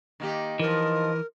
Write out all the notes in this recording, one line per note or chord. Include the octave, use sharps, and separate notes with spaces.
D#3 A#3 G4
E3 F3 D#4 A#4